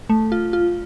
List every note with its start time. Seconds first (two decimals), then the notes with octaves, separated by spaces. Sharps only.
0.10 A3
0.32 F4
0.53 F4